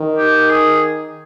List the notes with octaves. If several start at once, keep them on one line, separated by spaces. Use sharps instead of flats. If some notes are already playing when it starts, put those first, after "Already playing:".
Already playing: D#3
G4
G#4